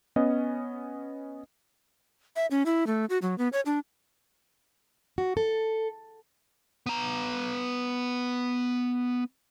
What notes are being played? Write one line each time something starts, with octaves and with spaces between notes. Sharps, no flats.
B3 C#4 D#5
E5
C#4
E4
A3
F#4
F#3
B3
C#5
D4
F#4
A4
B3 A#5